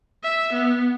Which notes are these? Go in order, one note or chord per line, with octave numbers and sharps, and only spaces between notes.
E5
B3